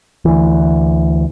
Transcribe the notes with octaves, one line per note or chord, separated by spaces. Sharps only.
D2 E3